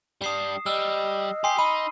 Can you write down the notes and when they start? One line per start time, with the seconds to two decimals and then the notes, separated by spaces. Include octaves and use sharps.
0.22 G3 D4 D#6 C7 E7
0.66 G3 D#5 E6 F6
1.44 G4 G#5 C6 D#6 C7
1.58 D#4 B5 D#7